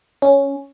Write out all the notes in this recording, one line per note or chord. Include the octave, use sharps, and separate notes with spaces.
C#4